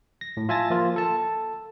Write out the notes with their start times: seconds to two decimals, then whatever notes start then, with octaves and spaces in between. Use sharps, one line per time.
0.21 A#6
0.37 A2
0.49 F4 E5 G#5 A5 A6 A#6
0.70 F3 A#3 F4
0.96 A4 A5